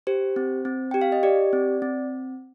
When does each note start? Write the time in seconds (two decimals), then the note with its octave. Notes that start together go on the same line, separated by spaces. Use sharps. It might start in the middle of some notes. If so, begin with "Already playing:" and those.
0.07 G4 C5
0.36 C4
0.65 C4
0.91 G4 G5
1.01 F5
1.12 D#5
1.23 G4 D5
1.53 C4
1.82 C4